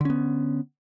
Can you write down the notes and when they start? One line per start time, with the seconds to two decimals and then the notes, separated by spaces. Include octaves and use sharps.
0.01 D3
0.05 C#4
0.10 B3